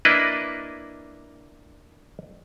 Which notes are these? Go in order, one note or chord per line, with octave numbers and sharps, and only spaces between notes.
A#3 D4 E4 B4 D#5